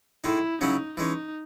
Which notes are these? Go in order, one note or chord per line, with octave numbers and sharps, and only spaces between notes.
A2 G#3 D#4 E4
C#3 F#3 C#4 D#4 E4
E3 G#3 C#4 D#4